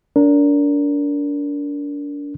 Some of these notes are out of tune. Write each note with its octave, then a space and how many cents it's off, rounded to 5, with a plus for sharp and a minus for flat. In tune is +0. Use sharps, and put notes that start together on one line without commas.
D4 -30 A#4 +0